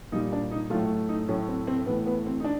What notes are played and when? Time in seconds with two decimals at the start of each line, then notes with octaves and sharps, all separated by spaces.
0.12 A#2 G3 D#4
0.32 D4
0.51 D#4
0.70 A2 F#3 A3 F4
1.09 D#4
1.28 A2 F#3 A3 C#4
1.48 C4
1.67 C4
1.86 A2 E3 A3 B3
2.06 B3
2.26 C4
2.40 D#4
2.44 D4